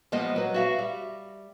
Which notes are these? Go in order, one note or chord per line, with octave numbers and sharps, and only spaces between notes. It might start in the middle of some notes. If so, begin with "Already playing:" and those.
F3 G3 G#3 B3 C5 D#5
F#3 B4
F#4 E5 F5
G3